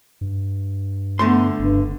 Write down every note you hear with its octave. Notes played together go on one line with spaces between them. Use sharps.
G2
D3 A3 B3 C6
F#1 G2